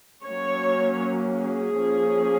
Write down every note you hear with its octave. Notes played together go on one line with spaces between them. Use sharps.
F#3 A#3 C#4 C#5
G#4
F3 A#3 C#4